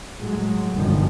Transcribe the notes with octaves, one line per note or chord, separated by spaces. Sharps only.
A2 F#3 G#3
G1 F#2 B2 D#3 F3